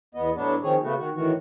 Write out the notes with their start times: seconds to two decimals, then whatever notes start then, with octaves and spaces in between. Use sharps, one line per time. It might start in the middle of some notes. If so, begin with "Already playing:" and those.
0.15 E2 B3 D#5
0.35 A2 F#3 B3 D4
0.63 D#3 F3 C4 G#4 C#5
0.82 C#3 A3 B3 F#4
0.97 D#3 F#4
1.15 A2 D#3 E3 F#4